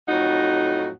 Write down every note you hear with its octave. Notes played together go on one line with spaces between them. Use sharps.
F2 A2 F#3 D#4 F#4